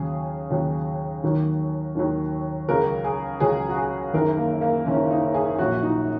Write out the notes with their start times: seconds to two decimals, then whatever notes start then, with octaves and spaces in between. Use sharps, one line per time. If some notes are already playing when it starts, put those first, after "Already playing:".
Already playing: D#2 C#3 F#3 G#4
0.50 D#2 C#3 F#3
1.23 D#2 D#3 F#3
1.95 D#2 D#3 F#3
2.69 C#2 C#3 F#3 A#4
3.04 G#4
3.40 C#2 C#3 F#3 G#4
3.69 F#4
3.78 G#4
4.13 F#1 F#2 D#3 A#4
4.37 A#3
4.61 A#3
4.86 F#1 F#2 D#3 C#4
5.10 D#4
5.34 G#4
5.59 A#1 A#2 F#3 F#4
5.83 D#4